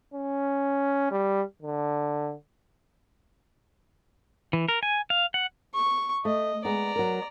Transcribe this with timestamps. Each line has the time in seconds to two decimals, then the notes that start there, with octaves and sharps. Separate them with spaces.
0.14 C#4
1.11 G3
1.62 D3
4.53 E3
4.68 A#4
4.83 G#5
5.10 F5
5.34 F#5
5.74 C#6
6.25 A3 D#5
6.65 G#3 B3 D5 A#5
6.96 F#3 A#4